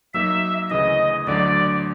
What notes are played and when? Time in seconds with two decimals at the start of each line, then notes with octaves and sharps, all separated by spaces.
0.14 F#3 A#3 D#4 E5
0.70 D2 C#3 E3 D#5
1.27 D2 D3 F#3 D5